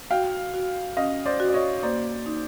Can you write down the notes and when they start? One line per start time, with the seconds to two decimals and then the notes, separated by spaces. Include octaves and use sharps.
0.11 F#4 F5 G5
0.54 F#4
0.97 C#4 D#5 F5
1.26 C5 D5
1.40 F#4
1.49 D5
1.54 C#5 D#5
1.83 A#3 C5 D5
2.26 D#4